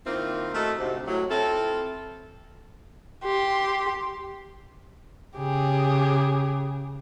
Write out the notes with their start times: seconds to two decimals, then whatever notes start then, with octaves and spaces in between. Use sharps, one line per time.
0.06 D#3 A#3 C4 E4 F4
0.54 A3 D#4 E4 F#4 A4
0.78 D2 G#2 C3
1.07 A2 F#3
1.30 C4 E4 F4 A4
3.23 G4 C6
5.37 C#3 G4 G#4